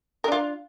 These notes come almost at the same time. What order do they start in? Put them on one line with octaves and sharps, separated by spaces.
A#4 D4 F4